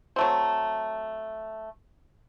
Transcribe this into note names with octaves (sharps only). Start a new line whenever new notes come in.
F#3 A3 C4